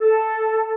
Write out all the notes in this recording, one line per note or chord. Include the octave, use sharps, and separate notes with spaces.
A4